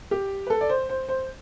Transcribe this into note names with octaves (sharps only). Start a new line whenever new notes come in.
G4
B4
A4
D5
C5
C5
C5